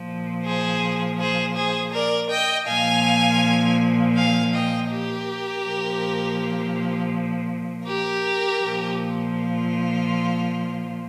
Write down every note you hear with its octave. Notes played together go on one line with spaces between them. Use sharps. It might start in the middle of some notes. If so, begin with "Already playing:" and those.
Already playing: A#2 F3
G#4 C5
G#4 C5
G#4 C5
A#4 D5
D#5 G5
A#2 F3 F5 G#5
F5 G#5
D#5 G5
G4 A#4
A#2 F3
G4 A#4
A#2 F3
F4